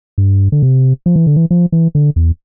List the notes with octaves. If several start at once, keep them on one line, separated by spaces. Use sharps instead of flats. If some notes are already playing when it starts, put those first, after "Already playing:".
G2
D3
C3
F3
E3
D3
E3
F3
E3
D3
E2